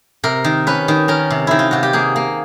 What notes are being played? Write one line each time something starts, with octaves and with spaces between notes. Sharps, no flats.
C3 A#4
D#3
C#4 B4
D#3
C#4 A#4
C3
D#3 E4
F4
C3 F#4
G4
A#3 G#4
A#3